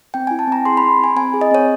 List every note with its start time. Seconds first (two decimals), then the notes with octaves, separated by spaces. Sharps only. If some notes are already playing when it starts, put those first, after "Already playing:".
0.14 C4 G5
0.27 G#5
0.31 E4
0.39 A5
0.47 C4 A#5
0.65 G#4 C6
0.77 B5
0.82 C4
0.99 E4 G#5
1.16 C4 G#5
1.34 G#4
1.41 D#5
1.51 C4 C#5